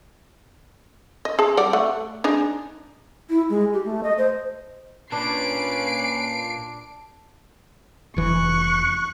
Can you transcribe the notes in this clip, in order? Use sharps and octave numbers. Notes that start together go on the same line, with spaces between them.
D#5
G#4 A5
G3 D5 F#5
A3 F#5
D4 D#4 G#4
E4
G#3
G4
A3
D#5
C5
A#2 C#4 D4 B4 C7 D7
F1 E3 C#6 F#6